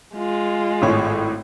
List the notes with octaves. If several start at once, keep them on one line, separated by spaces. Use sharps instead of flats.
G#3 F4
G#1 A2 C#5